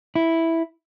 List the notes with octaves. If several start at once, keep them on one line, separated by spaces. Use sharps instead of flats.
E4